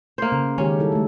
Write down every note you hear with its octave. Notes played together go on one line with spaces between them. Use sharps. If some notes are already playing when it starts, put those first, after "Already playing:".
A#3 C5
C#3
D#3 G#3 C#4 G4
G3 E4 A4
G#3 A3